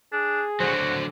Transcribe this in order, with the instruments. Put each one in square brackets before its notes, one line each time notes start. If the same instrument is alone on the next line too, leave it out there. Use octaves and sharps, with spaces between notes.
[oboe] D4 [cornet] G#4
[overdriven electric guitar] D3 F#3 [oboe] F#4 [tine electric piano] C5